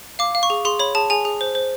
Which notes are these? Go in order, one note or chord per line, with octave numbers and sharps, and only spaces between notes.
F5 D6
F5
C#6
G#4
G#4 C6
C#5 B5
G#4 A5
G#4 G#5
G#4
C5
C5